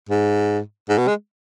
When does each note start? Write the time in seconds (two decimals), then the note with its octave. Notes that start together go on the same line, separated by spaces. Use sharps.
0.09 G#2
0.89 G#2
0.98 B2
1.08 G#3